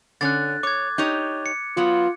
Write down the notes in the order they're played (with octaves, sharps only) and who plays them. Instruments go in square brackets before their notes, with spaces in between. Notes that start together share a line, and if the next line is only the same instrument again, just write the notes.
[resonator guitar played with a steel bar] D3 C#4 [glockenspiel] F#6 A6
[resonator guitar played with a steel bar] C#5 [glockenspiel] D6 G#6
[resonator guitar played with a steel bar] D#4 G4 C#5
[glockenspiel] C#7
[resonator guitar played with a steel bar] F#3 B3 [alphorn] F4